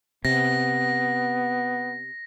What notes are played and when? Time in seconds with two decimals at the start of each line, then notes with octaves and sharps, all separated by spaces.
0.25 C3 B3 A#6